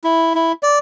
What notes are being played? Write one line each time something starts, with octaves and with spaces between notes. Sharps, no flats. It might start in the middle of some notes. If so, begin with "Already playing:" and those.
E4
E4
D5